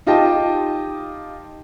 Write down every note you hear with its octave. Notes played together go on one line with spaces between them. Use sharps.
D#4 F4 G4 D#5 G5 A5